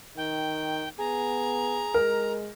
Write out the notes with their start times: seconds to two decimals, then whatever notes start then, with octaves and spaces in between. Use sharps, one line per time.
0.17 D#3 G5
0.99 B3 G#4 A#5
1.94 G#3 A#4